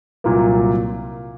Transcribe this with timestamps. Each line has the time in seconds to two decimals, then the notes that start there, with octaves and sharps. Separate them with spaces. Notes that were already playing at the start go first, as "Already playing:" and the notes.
0.24 C2 A#2 F#3 A#3